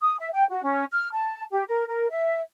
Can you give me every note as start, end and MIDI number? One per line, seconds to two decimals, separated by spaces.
0.01 0.16 87
0.19 0.30 76
0.34 0.45 79
0.50 0.64 66
0.64 0.85 61
0.92 1.08 89
1.13 1.43 81
1.51 1.63 67
1.68 1.84 70
1.88 2.07 70
2.10 2.40 76